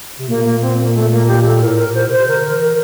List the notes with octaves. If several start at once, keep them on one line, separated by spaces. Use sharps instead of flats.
C3
A#2 A#3
A#3
C4
A#3
A3
A#3
G4
A4
A4
A2 A#4
A#4
A#2
C5
C3
C5
C3
D3 A#4
A#4
E3
A#4